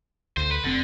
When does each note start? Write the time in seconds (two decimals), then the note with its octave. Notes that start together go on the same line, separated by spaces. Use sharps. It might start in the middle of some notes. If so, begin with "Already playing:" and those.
0.37 D2 C5
0.51 B4
0.64 F1 D3 C4